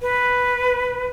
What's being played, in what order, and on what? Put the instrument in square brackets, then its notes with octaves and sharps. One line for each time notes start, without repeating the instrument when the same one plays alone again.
[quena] B4